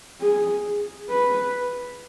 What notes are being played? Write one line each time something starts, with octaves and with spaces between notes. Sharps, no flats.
G#4
B4